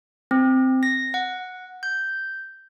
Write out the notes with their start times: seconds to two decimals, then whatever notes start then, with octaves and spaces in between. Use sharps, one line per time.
0.31 C4
0.83 A#6
1.14 F#5
1.83 G6